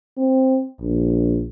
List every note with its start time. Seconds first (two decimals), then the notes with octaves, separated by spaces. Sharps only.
0.17 C4
0.80 A#1